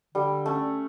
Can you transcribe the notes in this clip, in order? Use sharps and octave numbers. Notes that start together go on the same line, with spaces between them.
D3 G3
A3 C#4